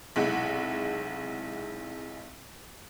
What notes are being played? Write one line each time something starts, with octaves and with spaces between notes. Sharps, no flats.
B1 C3 G#3 E4 F#5